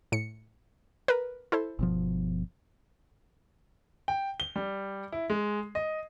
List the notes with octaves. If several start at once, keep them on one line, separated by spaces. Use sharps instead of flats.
A2 C#7
A#4 B4
E4 A4 C5
G1 B2 F3
G5
G7
G3
E4
G#3
D#5